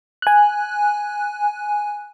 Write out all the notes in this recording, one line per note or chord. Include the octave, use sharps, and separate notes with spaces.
G#5 F#6